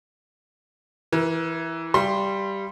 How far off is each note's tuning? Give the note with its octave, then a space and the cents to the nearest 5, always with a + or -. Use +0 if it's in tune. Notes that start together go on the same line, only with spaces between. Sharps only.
E3 +0 A#4 +30
G3 +0 F5 -35 C6 +0